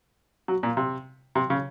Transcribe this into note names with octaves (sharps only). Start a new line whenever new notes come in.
F#3
A#2
C3
C3
C#3